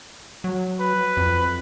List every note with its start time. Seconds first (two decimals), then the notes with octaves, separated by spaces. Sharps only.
0.44 F#3
0.80 B4
1.17 F2